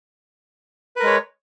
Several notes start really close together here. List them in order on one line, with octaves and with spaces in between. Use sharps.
B4 A#4 G#3 C#5